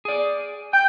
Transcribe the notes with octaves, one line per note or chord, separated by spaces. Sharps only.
G#4 D5
G5 G6